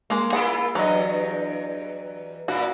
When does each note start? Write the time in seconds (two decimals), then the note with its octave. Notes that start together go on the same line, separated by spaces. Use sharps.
0.10 G#3 A#3
0.32 A#3 E4 F4 G#4 F#5
0.75 E2 G2 F#3 D#5
2.48 A#2 A#3 E4 F#4